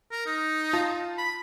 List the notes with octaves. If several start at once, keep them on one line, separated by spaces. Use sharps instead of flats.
A#4
D#4
F4 A5
B5